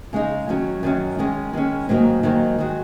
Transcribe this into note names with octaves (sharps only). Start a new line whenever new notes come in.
C#3 G#3 D#4
F#2 D#3 F#3 C#4
F#2 D#3 F#3 C#4
D#3 G#3 C#4
D#3 G#3 C#4
G#2 D#3 F#3 A#3 D#4
G#2 D#3 F#3 A#3 D#4
D#3 G#3 F#4